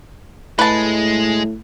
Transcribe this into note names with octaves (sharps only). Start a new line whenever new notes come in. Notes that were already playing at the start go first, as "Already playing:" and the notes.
A2 G#3 B4 A5